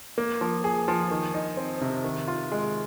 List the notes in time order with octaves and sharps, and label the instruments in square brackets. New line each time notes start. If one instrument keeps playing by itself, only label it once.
[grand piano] A#3
F3
G#4
F3
D#3
D#4
C4
C3
D#3
F4
G#3